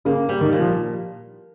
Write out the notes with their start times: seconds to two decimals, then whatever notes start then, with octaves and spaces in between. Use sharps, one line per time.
0.05 C#3 A#3
0.29 G3
0.41 D#3
0.53 A#2
0.60 F3